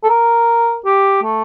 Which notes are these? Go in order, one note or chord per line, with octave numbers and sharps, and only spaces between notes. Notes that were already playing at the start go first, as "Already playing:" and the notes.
A4
A#4
G4
A3